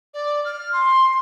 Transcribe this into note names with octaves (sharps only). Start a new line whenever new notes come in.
D5
F6
C6